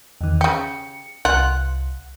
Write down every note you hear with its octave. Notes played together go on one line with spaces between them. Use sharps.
E2 D#3
C#3 G4 C#7
C2 F4 F#5